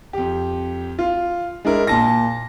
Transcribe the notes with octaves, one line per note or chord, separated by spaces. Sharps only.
F2 G4
F4
G#3 D4 E4 A#4
A#2 A5 A#6